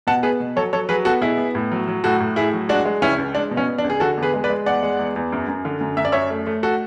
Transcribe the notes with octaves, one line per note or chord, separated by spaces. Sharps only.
B2 F#5 A5
B3 G#4 B4
B2
F#3 A4 C#5
F#3 A4 C#5
F#3 G#4 B4
B3 F#4 A4
B2 E4 G#4
B3
A2
F#3
F#3
A2 F#4 A4
A2
A2 E4 G#4
F#3
G#3 D4 F#4
G#3
C#2 C#4 E4
C#2
G#3 D4
B2
C#4
B3
D4
C#2
G#4
D3 F#4 A4
E2
G#4 B4
G#3
B4 D5
G#3
E2 D5 F#5
G#3
E2
E2
F#2
F#2
D3
F#2
F#2 E5
D5
F#2 C#5 E5
A3
A3
F#4 A4